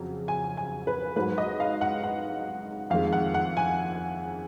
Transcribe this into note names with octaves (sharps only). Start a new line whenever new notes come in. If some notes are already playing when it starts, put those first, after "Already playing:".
Already playing: F2 C#3 F#3
G#5
G#5
B4
G#2 F#3 B4
D#5
F5
F#5
F#5
F2 D#3 G#3 F5
F#5
F#5
G#5